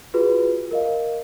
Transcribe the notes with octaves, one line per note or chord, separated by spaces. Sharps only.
F4 F#4 G#4 B4
A#4 D#5 F5